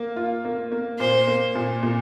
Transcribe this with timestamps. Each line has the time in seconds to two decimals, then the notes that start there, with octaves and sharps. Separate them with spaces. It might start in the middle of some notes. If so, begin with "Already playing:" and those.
Already playing: A#3
0.16 F4
0.45 A#3
0.72 A#3
0.99 A#2 C5
1.27 A#3
1.55 A#2
1.83 A#2